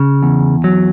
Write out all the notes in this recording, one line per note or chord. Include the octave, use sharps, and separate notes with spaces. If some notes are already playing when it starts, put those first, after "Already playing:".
Already playing: C#3
E2
F#3